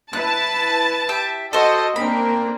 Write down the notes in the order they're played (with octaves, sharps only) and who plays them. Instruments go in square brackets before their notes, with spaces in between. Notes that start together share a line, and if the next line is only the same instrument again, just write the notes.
[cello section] E4 B4 [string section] A5 [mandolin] F#6
[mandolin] G4 E5
[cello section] F#4 [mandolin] A4 C5 [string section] D#5
[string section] A#3 [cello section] C4 D4 A#4 [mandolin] B5